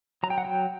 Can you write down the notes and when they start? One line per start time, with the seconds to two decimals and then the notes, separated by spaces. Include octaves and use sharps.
0.23 F#3 A#5
0.30 G5
0.38 F#5
0.45 F#3 G5